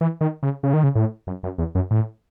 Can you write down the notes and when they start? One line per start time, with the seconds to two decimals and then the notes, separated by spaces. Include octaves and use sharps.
0.01 E3
0.21 D#3
0.43 C#3
0.63 C#3
0.74 D#3
0.84 C#3
0.95 A2
1.27 F#2
1.43 F#2
1.58 E2
1.75 F#2
1.91 A2